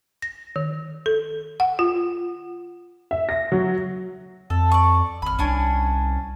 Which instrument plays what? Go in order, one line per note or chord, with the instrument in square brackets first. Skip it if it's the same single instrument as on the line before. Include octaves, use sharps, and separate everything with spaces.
[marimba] A#6
D#3
A4
F#5
F4
[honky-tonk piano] E5
A#6
F#3
[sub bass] F2 [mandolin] A4
[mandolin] D5 C#6
[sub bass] G#1 [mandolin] B5 F6
[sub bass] C2 [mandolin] C#4 D4 G#5